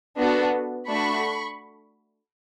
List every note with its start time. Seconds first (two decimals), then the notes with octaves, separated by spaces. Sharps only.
0.18 B3 D4 F#4 A4
0.89 A3 D4 F#4 A4 B5 C#6